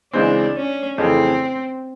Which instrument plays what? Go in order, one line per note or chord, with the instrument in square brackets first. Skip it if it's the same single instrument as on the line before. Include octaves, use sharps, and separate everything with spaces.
[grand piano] C#2 C#3 E3 G#3 C4 [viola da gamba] D4
[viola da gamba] C#4
[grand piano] F2 C#3 E3 A3 [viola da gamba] C4